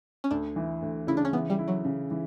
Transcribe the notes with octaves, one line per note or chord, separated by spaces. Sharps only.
C#4
D2 D4
E3
D2
C#3 E4
D4
C#4
E3 B3
G3
E4
F#3
C#3
E3